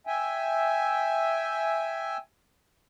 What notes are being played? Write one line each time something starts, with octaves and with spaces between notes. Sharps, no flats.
E5 G5 G#5